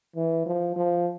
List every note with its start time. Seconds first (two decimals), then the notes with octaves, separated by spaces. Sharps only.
0.16 E3
0.46 F3
0.76 F3